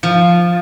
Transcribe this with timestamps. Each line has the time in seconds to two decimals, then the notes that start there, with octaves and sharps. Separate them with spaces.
0.03 F3